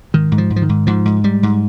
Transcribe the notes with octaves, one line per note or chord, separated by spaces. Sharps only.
G#2 D#3
G#2
F3
G#2
F3
D#3
G#2
G#2 F3
G#2
G#2 G3
G#2